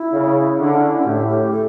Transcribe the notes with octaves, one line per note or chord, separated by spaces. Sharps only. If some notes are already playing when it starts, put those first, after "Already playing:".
Already playing: E4
C#3
D3 D4
C#4
E4
A2 G4
G4
A4